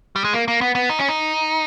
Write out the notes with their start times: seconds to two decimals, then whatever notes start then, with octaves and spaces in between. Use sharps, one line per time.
0.16 G3
0.24 G#3
0.34 A#3
0.48 A#3
0.61 B3
0.75 B3
0.90 D#4
0.99 C#4
1.09 D#4